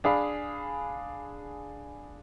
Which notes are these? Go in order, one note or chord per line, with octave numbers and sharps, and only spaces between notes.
D4 G#4 F5 B5